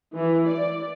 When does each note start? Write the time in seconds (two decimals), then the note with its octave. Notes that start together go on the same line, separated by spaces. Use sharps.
0.14 E3
0.48 D5